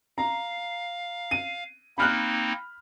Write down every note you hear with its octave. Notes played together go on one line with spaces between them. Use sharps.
F5 A#5
D#7
A#3 C4 D#4 B5 F6 F#6